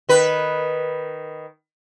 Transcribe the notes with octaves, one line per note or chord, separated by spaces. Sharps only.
D#3 B4